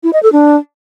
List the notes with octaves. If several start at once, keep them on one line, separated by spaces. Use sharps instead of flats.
E4
D#5
A4
D4